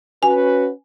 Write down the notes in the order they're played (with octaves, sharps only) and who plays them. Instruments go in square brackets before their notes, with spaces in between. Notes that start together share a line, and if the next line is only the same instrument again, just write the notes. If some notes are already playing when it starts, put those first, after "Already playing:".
[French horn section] C#4 F#4 B4 [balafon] G#5